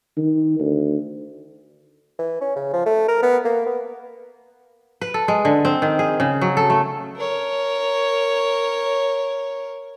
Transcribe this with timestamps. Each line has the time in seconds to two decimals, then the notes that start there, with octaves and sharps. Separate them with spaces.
0.17 D#3
0.59 D2
2.19 E3
2.41 C#4
2.56 C#3
2.73 F3
2.86 A3
3.09 A#4
3.23 B3
3.45 A#3
3.66 B3
5.01 B4
5.14 A4
5.28 G#3
5.45 D3
5.65 C4
5.82 D#3
5.99 G#4
6.20 C#3
6.41 F#3
6.57 A4
6.70 A3
7.17 A#4 C#5